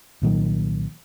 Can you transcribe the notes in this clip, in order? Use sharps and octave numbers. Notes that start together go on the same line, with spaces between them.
C2 A#2 D#3 F#3